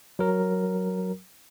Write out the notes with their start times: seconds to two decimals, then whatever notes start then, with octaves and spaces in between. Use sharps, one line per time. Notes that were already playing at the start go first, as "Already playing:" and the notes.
0.19 F#3 A#4